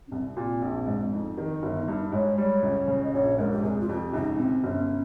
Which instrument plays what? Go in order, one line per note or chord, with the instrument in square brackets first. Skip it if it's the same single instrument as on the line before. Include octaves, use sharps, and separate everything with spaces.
[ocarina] C#4
[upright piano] C2 [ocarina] C4
[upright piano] A#2
A#1
G#2
[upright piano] F2 [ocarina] D#4
[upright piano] D#3
G1
G2
[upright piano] G#2 [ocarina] C#5
[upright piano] G3 [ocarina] C#5
[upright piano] C#2
C#3
[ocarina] D#5
[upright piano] A#1 [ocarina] C#5
[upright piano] G#2 [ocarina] A#4
[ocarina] G4
[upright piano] F1 [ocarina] G#4
[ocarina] F4
[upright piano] F2 [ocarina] G4
[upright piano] C#2 [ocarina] D#4
[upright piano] C3 [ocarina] C4
[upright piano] G1 [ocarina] C#4